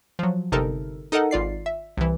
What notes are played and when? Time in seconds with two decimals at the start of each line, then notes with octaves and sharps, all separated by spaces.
0.19 F3 F#3
0.52 G1 C3 D#4 A4 A#4
1.12 D#4 A4 A#4 D#5 F#5
1.31 G#1 F4 D5 C7
1.66 E5
1.97 C2 E3